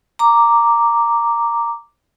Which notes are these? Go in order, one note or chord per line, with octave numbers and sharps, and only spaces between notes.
A#5 D6